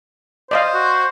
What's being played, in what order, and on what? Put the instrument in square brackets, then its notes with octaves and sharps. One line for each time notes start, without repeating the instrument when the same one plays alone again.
[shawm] C5 [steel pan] D5 D#5 F5
[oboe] F#4